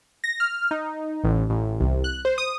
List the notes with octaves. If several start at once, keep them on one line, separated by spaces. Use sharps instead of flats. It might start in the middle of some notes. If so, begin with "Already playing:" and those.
A#6
F6
D#4
A1
A1
C2
F#6
C5
D#6